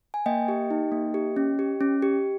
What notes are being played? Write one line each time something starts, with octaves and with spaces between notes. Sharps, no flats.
G#5
A#3 D#5 G5
G4
D#4
A#3
G4
C#4
G4
C#4
G4